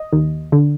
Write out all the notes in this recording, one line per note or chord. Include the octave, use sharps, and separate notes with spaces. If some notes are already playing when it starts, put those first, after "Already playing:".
Already playing: D#5
D#2
D3